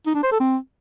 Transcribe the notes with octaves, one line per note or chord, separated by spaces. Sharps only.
D#4
D4
C5
A4
C4